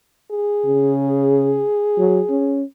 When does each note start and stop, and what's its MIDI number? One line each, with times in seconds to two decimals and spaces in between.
0.31 2.60 68
0.65 1.62 49
1.98 2.20 54
2.30 2.63 61